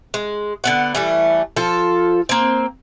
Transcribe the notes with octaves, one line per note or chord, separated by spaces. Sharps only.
G#3
D3 B3 F#5
E3 G3 A3
F3 F4 A4
A#3 C4